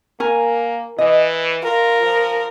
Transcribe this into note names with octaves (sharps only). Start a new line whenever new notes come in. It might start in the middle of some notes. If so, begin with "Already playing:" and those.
A#3 A#4 G#5
E3 D#5
F4 A#4
F3